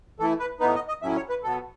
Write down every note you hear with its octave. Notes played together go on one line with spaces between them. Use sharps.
E3 A3 E4 A4
B4
A2 E3 B3 D#4 B4
D#5
D#5
A2 F#3 C#4 E4 E5
C#5
B4
B2 F#3 B3 A4